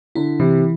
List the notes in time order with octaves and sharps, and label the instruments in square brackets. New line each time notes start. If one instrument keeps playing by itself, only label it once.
[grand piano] D3 [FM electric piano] E4
[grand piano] C3 [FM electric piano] E3